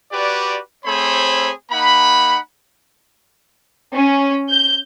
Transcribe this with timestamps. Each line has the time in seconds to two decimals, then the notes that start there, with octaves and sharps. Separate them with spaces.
0.12 F#4 G4 B4 D5
0.85 A3 C4 G#4 C5 C#5 B5
1.70 A#3 D#4 F#5 B5
3.93 C#4
4.49 G6